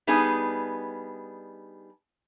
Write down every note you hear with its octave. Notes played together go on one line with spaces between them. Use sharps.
G3 B3 D4 D#4 G#4